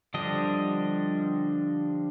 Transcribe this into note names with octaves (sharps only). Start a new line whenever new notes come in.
D3 F3 G3 D4 D#5